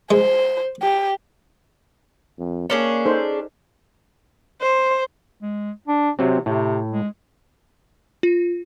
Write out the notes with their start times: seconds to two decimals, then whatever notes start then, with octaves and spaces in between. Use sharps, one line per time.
0.11 G#3 C5
0.82 G4
2.39 F2
2.70 A#3 C#4 D4 G#4
3.06 D#4 A4 C5
4.62 C5
5.42 G#3
5.88 D4
6.19 C3 F#3 C4
6.46 A2 C3
6.91 G#3
8.23 F4